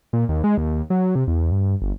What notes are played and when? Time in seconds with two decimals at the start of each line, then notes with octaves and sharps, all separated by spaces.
0.13 A#2
0.29 D#2
0.44 G#3
0.58 D#2
0.90 F#3
1.15 C3
1.27 E2
1.51 G2
1.82 G1